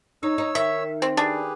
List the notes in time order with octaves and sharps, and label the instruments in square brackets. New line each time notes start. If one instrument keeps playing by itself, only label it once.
[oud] D#4 [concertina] C#5 E6
[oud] D#4
[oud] D#3 [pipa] E5
[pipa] C4
[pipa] D4 [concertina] G4 G#4 B4